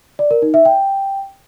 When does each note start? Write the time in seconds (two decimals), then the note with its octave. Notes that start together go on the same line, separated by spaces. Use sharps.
0.19 D5
0.31 A#4
0.42 D#4
0.54 E5
0.65 G5